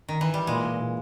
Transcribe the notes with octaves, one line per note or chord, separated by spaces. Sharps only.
D#3
E3
G3
A#2 G#3
A#2
A#2